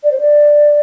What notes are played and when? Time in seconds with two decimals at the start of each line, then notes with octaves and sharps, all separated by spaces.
0.03 D5
0.11 C5
0.20 D5